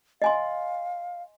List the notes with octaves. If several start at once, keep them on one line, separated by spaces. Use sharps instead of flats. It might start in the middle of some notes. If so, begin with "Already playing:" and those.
D#5 F5 G#5 C6